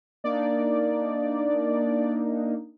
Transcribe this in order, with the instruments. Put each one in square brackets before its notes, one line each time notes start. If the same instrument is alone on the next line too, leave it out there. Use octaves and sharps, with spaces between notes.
[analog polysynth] A#3 D4 D#4 [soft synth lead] D5